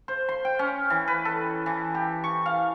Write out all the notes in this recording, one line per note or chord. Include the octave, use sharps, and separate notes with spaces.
C5
C6
G5
C#4
E3
B4
A4
E3
G4
C#6
F5